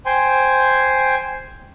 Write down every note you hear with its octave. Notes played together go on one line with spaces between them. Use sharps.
C5 G5 G#5 C6